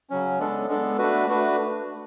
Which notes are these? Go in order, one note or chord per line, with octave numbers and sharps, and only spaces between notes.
C#3 F#3 C#4
G#3 B3 D4 A4
G#3 B3 D4 A4
A3 D4 F#4 B4
A3 D4 F#4 B4